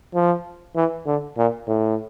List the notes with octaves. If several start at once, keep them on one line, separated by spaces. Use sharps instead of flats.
F3
E3
D3
A#2
A2